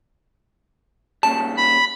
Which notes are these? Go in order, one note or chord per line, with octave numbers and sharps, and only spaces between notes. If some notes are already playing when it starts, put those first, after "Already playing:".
A#2 C#3 G3 A5
B5